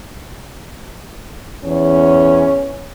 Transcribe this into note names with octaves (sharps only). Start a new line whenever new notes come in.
E2 C#4